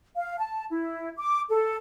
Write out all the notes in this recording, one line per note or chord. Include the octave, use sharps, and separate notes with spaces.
F5
A5
E4
D6
A4